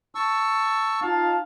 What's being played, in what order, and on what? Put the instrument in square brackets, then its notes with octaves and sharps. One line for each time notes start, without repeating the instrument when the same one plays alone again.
[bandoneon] A5 C#6 E6
[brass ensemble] D#4 F4 F5 [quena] A5